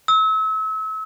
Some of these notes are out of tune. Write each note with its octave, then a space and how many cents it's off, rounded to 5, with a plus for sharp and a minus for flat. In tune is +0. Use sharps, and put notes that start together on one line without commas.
E6 -35